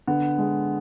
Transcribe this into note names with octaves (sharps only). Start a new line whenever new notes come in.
D3 B3
G#3